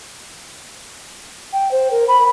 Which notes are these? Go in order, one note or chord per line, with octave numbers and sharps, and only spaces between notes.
G5
C5
A#4
B5